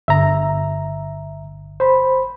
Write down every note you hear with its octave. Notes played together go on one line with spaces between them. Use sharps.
G1 E5 A#5
C5 B5